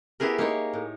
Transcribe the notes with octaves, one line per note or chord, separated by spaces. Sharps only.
B3 E4 G4 G#4 A#4
A#3 D#4 C#5
A2